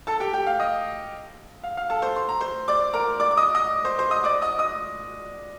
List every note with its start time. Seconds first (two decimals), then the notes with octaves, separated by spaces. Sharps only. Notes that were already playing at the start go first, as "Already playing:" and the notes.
0.07 A4 A5
0.20 G4 G5
0.33 G4 G5
0.47 F5
0.60 D#5
1.63 F5
1.77 F5
1.90 A4 A5
2.02 C5 C6
2.16 C6
2.29 A#5
2.40 C5 C6
2.68 D5 D6
2.93 A#4 A#5
3.20 D5 D6
3.31 D6
3.37 D#5 D#6
3.55 D#5 D#6
3.85 C5 C6
3.98 C5 C6
4.11 D#5 D#6
4.24 D5 D6
4.42 D#5 D#6
4.59 D#5 D#6